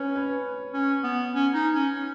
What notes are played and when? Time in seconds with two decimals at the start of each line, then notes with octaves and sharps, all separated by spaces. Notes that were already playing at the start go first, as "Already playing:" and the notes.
Already playing: C#4 B4 C#5
0.15 B4
0.74 C#4
1.04 B3
1.34 C#4
1.54 D#4
1.73 C#4
1.93 C#4